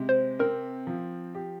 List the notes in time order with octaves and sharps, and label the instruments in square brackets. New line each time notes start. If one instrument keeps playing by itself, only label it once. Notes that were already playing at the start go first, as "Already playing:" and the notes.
Already playing: [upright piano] C3 G#3
[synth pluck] C5
[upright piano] C4 [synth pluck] A#4
[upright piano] F3
G4